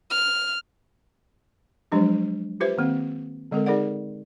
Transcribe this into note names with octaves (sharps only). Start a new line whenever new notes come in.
F6
F3 F#3 G#3 D4 G4
F4 G4 B4 C5 E5
D#3 A#3 C4
D3 G#3 C4 A4 A#4
D#4 G#4 A#4 D5 F#5